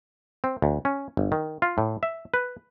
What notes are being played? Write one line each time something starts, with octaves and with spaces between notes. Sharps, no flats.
C4
D2
C#4
G1
D#3
F4
A2
E5
B4